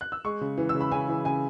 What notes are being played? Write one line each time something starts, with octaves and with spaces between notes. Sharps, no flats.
F#6
E6
G#3 C#6
C#3
E3
E6
C#3
B5
C#3 G#5
E3
C#3 G#5